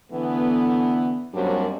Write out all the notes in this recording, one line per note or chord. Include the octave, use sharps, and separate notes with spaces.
D3 E3 A3 B3
F#2 F#3 G3 A#3 C4 D4